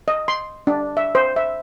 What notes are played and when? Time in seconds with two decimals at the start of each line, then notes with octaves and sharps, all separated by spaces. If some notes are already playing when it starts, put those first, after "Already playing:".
0.08 D#5
0.28 C6
0.67 D4
0.97 E5
1.15 C5
1.36 E5